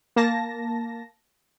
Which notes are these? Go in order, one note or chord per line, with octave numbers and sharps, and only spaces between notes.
A#3 A5 A#6